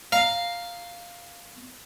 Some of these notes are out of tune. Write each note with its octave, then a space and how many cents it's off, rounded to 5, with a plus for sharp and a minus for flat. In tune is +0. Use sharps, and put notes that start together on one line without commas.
F5 +0 A#5 +0